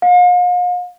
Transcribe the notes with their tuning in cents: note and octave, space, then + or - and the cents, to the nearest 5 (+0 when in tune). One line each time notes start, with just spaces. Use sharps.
F5 +40